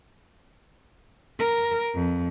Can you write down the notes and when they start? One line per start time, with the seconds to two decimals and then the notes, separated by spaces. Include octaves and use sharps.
1.40 A#4
1.95 F2